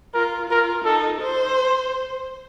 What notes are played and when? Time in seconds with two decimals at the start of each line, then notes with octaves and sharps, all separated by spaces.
0.14 F4 A#4
0.50 F4 A#4
0.85 D#4 A4
1.21 C5